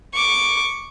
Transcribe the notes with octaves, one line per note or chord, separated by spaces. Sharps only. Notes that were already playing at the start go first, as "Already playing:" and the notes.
C#6 D6